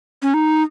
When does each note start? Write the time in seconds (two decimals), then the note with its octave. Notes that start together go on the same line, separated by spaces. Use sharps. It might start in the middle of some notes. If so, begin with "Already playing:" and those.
0.22 C#4
0.34 D#4